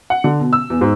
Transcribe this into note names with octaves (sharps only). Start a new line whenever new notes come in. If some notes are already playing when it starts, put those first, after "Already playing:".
F#5
D3
B2
E6
E2
G#2